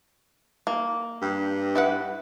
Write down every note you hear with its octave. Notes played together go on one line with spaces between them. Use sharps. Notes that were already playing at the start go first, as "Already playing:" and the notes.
A#3
G2
E4 B4 F#5